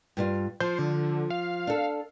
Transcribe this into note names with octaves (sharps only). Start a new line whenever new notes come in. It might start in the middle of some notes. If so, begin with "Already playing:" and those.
G2 G3 F4
F3 C5
D3
F5
D4 A4